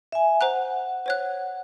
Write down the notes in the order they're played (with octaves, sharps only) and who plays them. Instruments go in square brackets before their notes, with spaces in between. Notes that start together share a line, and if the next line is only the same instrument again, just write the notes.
[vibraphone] E5 G#5
[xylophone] C5 A#5 F#6 [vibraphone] F#5
[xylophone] C5 C#5 F#6